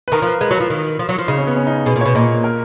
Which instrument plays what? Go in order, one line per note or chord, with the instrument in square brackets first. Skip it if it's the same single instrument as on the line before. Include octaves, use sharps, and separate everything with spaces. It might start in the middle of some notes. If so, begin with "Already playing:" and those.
[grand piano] B4
[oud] D#3 [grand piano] A#4
[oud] F3 [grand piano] B4
[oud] G#3 [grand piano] B4
[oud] F#3
[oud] F3 [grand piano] B4
[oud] D#3
F3
F#3
F3
[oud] C#3 [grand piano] D#4
[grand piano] C#4
B3
C#4
D#4
[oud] B2 [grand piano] G#4
[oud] A#2
[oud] B2 [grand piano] C#5
[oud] A#2 [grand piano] D#5
[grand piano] A#4